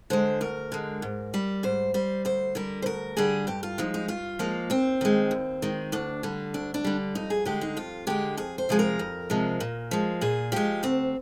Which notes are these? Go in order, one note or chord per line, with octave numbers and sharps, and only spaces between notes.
D3 G#3 C5
D2 A#4
D3 G#3
G#2
G3
G#2 C5
G3 C5
D2 C5
D3 G3 A#4
C5
D2 A#4
D3 G3 G#4
G2 G4
F4
F3 G#3 D#4
D#4
G2 F4
F3 G#3 A#3
D#2 C4
D#3 G#3
D#2
D#3 G#3
D2 D4
D3 G3
D2 D4
D4
D3 G3
F2 D#4
G#4
D3 G#3 G4
D#4
F2 F4
D3 G#3 G4
F2 G#4
C5
C3 F3 G#3 G#4
A#4
F2
C3 F3 G#3
A#2
F3 G#3
A#2 G#4
F3 G#3 G4
D2 C4